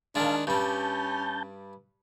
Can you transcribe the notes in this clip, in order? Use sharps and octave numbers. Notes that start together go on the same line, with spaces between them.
D#3 G#3 D4 F5 A5
G2 G3 C#4 A5 G6